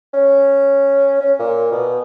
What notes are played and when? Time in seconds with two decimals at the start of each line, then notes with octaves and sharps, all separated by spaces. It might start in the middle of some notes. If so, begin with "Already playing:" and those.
0.14 C#4
1.20 C#4
1.39 A#2
1.72 B2